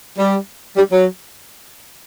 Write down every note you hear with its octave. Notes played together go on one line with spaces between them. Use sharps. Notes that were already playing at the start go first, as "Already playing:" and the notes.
G3
G3
F#3